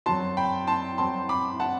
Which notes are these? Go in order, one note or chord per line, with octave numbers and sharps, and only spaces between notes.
F#2 F#3 C4 F#4 A5 C6
G5 B5
A5 C6
F#2 F#3 C4 F#4 A5 C6
B5 D6
F#5 A5